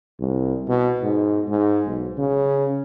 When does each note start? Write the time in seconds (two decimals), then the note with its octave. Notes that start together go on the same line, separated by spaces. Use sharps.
0.20 C2
0.68 B2
1.03 G#2
1.49 G#2
1.87 B1
2.18 C#3